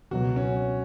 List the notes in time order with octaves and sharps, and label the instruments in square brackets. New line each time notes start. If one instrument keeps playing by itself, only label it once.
[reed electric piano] C#2 B2 F#3 [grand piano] F#4
[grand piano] C#4